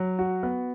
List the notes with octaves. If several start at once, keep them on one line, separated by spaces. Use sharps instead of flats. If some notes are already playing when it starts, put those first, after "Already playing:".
Already playing: F#3
F#4
B3